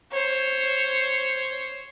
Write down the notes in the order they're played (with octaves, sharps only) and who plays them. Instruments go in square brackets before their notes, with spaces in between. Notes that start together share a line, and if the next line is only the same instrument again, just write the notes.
[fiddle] C5 C#5